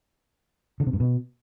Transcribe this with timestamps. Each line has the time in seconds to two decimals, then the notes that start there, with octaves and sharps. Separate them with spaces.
0.80 D3
0.87 C3
0.93 G2
1.00 B2